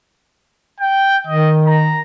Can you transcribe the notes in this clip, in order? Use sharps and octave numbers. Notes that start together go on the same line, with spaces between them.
G5
D#3 D#5
A#5